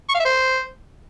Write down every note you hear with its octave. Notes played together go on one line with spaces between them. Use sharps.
C#6
F5
E5
C5